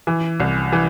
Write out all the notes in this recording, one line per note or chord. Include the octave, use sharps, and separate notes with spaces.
E3
C2
E3